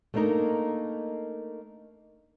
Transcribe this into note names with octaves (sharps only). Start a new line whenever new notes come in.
A3 A#3 D4 D#4 A#4 D#5